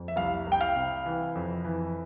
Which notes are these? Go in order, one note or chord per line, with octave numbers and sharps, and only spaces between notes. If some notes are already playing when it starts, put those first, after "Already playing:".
Already playing: F2
E5
C2 F5
C2
G5
F5
C3
E3
F2
E3